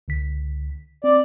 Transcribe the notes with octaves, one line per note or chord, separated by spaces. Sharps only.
C#2 D3 B6
C4 D5